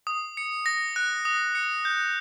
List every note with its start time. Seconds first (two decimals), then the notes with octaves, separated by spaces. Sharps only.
0.07 D#6
0.37 C#7
0.66 A#6
0.96 F#6
1.25 D#6
1.55 C#7
1.85 G6